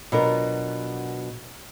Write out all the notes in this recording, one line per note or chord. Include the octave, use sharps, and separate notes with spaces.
B2 F#3 D4 F4 A#4